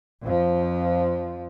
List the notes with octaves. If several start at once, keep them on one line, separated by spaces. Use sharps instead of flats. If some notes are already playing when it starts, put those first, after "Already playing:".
F2 F3